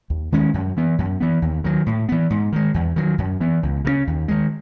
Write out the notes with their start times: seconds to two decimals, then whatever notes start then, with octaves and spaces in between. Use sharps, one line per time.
0.10 D#2
0.32 D#3 G#3 C#4
0.54 F#2
0.77 E3 B3
0.98 F#2
1.20 E3 B3
1.42 D#2
1.64 D#3 F#3
1.86 A2
2.09 E3 B3
2.30 G#2
2.52 D#3 G#3
2.74 E2
2.96 D#3 F#3
3.18 F#2
3.40 E3 B3
3.63 C#2
3.85 C#3 G#3 C#4
4.07 D#2
4.28 D#3 G#3